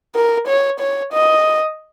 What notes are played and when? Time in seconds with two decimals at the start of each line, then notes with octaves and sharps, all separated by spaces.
0.15 A#4
0.47 C#5
0.80 C#5
1.13 D#5